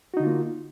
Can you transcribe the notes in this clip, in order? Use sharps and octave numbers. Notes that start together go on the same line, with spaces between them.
D3 A#3 D#4 F4 F#4